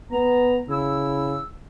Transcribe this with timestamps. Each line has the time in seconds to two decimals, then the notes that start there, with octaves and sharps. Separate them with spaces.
0.11 B3 A#5
0.69 C#3 E4 E6